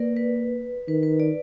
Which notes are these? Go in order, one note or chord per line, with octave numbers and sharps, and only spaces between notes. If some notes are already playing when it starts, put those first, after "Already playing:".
Already playing: A#3 A#4 B4 D5
B4
D#3 B4
B4
D5